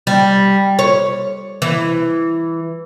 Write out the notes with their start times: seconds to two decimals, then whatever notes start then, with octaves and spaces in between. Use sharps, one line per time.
0.07 G3
0.79 C#5
1.62 E3